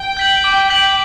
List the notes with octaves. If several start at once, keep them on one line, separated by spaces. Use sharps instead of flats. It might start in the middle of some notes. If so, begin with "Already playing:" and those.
Already playing: G5
G6 B6 F#7
D6
G6 B6 F#7